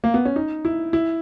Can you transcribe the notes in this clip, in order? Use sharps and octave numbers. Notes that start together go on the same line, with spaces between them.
A#3
B3
C#4
D#4
E4
E4